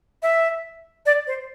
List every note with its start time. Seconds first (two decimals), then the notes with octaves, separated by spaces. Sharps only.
0.23 E5
1.06 D5
1.27 C5